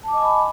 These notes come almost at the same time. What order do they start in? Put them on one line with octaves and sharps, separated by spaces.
A5 D6 D#5 G#5 B5